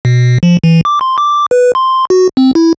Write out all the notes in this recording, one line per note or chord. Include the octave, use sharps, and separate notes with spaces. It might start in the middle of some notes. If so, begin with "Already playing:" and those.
B2
F3
E3
D6
C6
D6
B4
C6
F#4
C4
E4